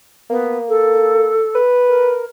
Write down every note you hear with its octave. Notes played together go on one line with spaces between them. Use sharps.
A#3 B3
A4
B4
A#4